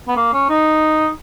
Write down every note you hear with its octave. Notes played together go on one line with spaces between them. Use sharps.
B3
A#3
C#4
D#4